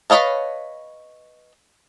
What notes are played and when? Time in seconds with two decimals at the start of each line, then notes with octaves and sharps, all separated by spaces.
0.10 B4 C#5 D#5 F5 A5